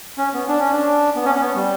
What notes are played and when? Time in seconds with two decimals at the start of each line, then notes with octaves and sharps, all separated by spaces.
0.18 C#4
0.34 B3
0.48 D4
0.60 C#4
0.72 D4
1.16 B3
1.25 C#4
1.35 C#4
1.40 B3
1.55 G3